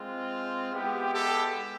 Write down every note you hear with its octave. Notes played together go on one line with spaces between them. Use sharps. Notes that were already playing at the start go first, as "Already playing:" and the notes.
Already playing: G#3 C4 F4
G#3 B3 E4 G4
G4 A4